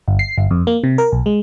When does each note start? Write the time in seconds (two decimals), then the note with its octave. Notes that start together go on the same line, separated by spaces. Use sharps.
0.08 G1
0.19 C7
0.38 G1
0.51 F2
0.67 A#3
0.84 C3
0.98 A#4
1.12 B1
1.26 G#3